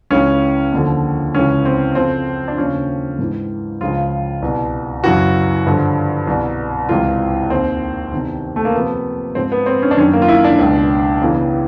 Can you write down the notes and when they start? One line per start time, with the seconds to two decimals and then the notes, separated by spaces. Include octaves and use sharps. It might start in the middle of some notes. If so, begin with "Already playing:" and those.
0.10 C#2 C#3 E3 C#4
0.72 D#2 D3 F3
1.34 C#2 C#3 E3 C#4
1.65 C4
1.95 F2 C#3 F3 C4
2.48 D4
2.57 D#2 C#3 F3 C#4
3.19 G#2 E3
3.81 C#2 C#3 F3 F4
4.42 C2 B2
5.04 F#2 C#3 E3 F#4
5.66 G2 D3 F3
6.27 C2 B2
6.89 C#2 C3 E3 F4
7.50 D#2 D#3 C4
8.12 E2 C3 D#3
8.56 A3
8.65 A#3
8.75 F2 C3 F3 B3
9.35 G#2 F3 C4
9.52 B3
9.66 C4
9.83 C#4
9.91 D4
9.97 F#2 D#3 C#4
10.13 A#3
10.22 F4
10.28 E4
10.44 D4
10.58 C#2 B2
11.20 E2 C#3 E3